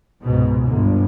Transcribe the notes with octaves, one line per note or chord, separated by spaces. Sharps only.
C#2 G#2 B2
G1 D3